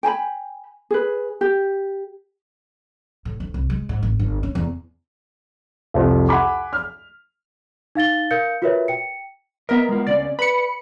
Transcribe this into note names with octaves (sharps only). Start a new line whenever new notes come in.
G5 G#5 A#5 B5
G#4 B4
G4
A2
D2
C2
G#3
G#2
G#1
G1
C#4
E2
C2 F2
F#5 G#5 B5 D6
F6
D#4 F5 A6 G7
A#4 F5 G6 C#7
F4 F#4 A#4 B4 C#5 E5
G5 C#7
B3 A#4 D#5 E5
G#3 F4
C#2 C#4 D5
B4 B5 C#7